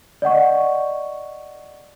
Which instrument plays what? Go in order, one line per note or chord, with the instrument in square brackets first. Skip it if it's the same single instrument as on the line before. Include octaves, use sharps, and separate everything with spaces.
[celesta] D5 D#5 F#5 C#6